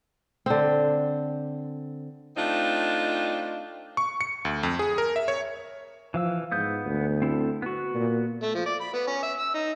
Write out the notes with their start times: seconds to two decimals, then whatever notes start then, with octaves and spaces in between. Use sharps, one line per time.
0.46 D3 C4
2.36 A3 C4 D4 D#4 F4
3.97 C#6
4.21 C#7
4.45 D2
4.63 F2
4.79 G#4
4.98 A#4
5.16 E5
5.28 C#5
6.14 E3 F3 F5 E6
6.52 G#2 B3 D#6 G6
6.86 D2
7.22 C4 E4 A4
7.62 B3 F#4
7.95 A#2
8.43 A3
8.55 F3
8.66 D5
8.81 B5
8.94 B3
9.07 C#4
9.23 E5
9.39 E6
9.54 D#4